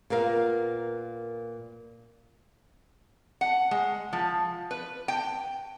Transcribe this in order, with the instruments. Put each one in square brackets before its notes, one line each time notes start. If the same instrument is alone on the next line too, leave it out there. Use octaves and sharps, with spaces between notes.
[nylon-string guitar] A#2 B3 A#4 F5
[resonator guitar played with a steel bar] F#5
G#3
F3
B4
G5